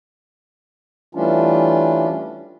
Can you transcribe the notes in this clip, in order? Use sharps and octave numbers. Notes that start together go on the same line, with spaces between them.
E3 G3 A3 C#4 D4 F4